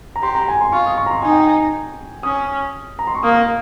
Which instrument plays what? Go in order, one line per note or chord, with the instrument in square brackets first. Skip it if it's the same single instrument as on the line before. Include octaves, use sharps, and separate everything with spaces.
[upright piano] A#5
[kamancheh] G4 [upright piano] C6
[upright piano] A#5
G#5
C6
[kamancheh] F4 [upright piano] C#6
[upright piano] D#6
C#6
A#5
C6
[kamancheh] D#4 [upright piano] G#5
[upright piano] G5
G#5
[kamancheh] C#4 [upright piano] D#6
[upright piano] A#5
C6
C#6
[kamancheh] A#3 [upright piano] D#6
[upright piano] F6